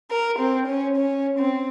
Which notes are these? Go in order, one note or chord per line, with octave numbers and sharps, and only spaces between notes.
A#4
C4
C#4
C#4
C4